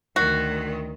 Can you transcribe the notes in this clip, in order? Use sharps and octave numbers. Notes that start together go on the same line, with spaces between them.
D2 D#3 F#4